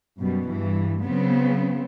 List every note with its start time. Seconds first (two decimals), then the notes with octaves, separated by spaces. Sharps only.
0.19 F#2 B2 G3
0.51 G2 E3
1.03 C#3 F#3 B3 C4